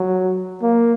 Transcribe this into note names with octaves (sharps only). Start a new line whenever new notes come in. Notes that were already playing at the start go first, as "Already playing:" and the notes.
Already playing: F#3
A#3